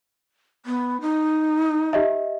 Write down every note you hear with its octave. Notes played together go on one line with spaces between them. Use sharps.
B3
D#4
G4 D#5 E5